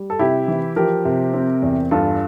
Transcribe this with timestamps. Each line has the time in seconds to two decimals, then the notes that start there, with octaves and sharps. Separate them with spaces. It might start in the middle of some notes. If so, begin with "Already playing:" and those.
Already playing: G3
0.10 A4
0.19 C3 E4 G4
0.48 E3
0.76 F3 G4 A#4
1.05 C3
1.34 C4
1.62 E2
1.91 G2 F4 A4